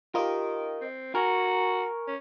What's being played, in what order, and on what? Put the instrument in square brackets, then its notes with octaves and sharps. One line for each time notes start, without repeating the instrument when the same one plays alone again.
[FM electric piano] F4 G4 [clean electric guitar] A#4 D#5
[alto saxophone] C4
[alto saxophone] F#4 [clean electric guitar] A#4 [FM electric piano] G#5 A#5 C#6
[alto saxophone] C#4